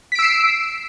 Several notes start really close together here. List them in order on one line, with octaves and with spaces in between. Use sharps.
B6 D7 E6 C7